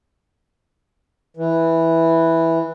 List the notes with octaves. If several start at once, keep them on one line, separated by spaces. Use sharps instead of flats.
E3